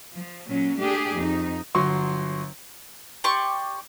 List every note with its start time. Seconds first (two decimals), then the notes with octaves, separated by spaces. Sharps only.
0.15 F3
0.48 A#2 F#3 C#4
0.80 A3 D4 G4 G#4
1.15 F2 D#4
1.75 G1 F#3 C6 C#6
3.24 G4 D5 C6 C#6